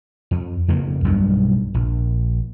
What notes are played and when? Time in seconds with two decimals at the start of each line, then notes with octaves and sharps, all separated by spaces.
0.31 F2
0.68 F2 C#3 A#3
1.04 B1 G2 B2
1.74 A#1